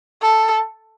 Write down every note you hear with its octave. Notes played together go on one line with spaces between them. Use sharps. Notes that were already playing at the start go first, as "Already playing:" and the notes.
A4